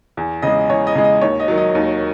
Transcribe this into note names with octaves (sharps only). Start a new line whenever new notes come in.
E2
C#3 G#3 D#5
E2 C#5
D#5
C#3 G#3
D#5
D#2 C#5
D#5
D#3 F#3
D#5
D#2